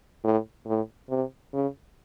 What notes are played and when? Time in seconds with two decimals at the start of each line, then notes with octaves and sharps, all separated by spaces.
0.24 A2
0.67 A2
1.10 C3
1.53 C#3